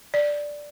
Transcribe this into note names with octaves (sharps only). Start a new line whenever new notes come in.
D5